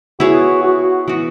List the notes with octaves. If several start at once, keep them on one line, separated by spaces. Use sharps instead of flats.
B3 E4 F#4 G#4 C#5
F#4
E3 B3 F#4